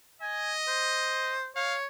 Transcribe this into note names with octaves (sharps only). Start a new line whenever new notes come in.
D#5 G#5
C5
C#5 F5